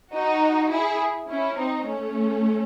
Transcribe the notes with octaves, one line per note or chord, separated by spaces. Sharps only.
D#4 F#4
E4 G#4
C#4 E4
C4 D#4
A3 C#4